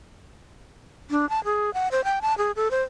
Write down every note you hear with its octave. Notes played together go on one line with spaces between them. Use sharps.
D4
A5
G#4
F#5
C5
G5
A5
G#4
A4
C5